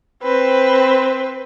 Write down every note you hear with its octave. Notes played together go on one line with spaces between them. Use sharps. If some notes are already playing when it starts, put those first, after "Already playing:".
C4 B4